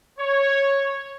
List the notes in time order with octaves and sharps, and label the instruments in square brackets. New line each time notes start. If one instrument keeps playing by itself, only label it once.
[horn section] C#5